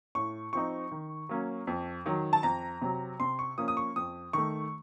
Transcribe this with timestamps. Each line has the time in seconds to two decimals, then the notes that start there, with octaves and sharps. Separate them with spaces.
0.15 A2 C#6
0.53 F3 C4 D#4 C#6
0.91 D#3
1.29 F#3 A#3 C#4
1.67 F2
2.06 D#3 F#3
2.33 A5
2.43 F2 A#5
2.82 C3 F#3
3.20 C3 C6
3.39 C#6
3.58 F3 A#3 C#4 D#6
3.68 D#6
3.77 C#6
3.96 F2 D#6
4.33 D#3 A3 C#6